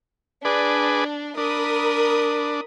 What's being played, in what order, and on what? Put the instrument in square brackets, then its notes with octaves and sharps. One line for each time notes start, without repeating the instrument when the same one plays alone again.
[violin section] D4 [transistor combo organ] G#4 B4 D5
[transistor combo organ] D4 [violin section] A#4 B5 D#6